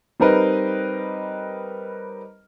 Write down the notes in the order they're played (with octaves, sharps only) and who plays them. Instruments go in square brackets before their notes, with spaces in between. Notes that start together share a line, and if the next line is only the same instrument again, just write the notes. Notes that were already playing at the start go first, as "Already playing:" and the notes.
[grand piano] G3 C4 D#4 A#4 B4 D#5